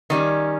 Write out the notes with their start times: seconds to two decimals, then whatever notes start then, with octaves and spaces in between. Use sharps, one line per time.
0.10 D#3 G3 C#4